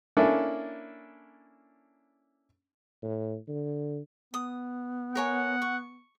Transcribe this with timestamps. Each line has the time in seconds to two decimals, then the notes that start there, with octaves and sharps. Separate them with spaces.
0.17 A#3 C#4 D4 E4 A4
3.03 A2
3.48 D3
4.34 B3 D#6
5.15 A#4 C#5 F#5 G#5
5.62 C#6